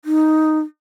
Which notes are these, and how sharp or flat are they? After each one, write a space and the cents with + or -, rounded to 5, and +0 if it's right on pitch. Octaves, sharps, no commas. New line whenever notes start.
D#4 +0